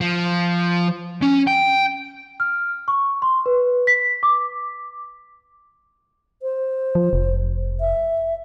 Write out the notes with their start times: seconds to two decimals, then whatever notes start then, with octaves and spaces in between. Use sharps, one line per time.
0.01 F3
1.22 C#4
1.47 G5
2.40 F6
2.88 C#6
3.22 C6
3.46 B4
3.87 B6
4.23 D6
6.42 C5
6.95 F3
7.13 F1
7.80 E5